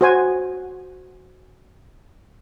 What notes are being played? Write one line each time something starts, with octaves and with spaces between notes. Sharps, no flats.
F#4 C5 G#5